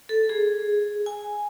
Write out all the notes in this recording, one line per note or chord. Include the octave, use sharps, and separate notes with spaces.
A4
G#4
G#5